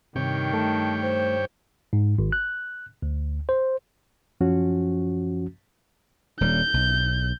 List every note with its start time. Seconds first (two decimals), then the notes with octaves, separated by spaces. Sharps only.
0.16 G2 C3 D#3 C#5 G5
0.53 A3 A5
1.02 C5
1.93 G#2
2.18 G#1
2.32 F#6
3.02 D2
3.49 C5
4.41 F#2 F3 C#4 F#4
6.41 D#1 G3 G6
6.74 B1